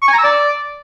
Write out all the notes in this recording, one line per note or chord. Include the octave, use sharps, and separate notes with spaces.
C#6
G#5
A#5
E6
D5